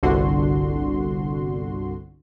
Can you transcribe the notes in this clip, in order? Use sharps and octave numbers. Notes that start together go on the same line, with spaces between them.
G1 C2 D3 F#4 C6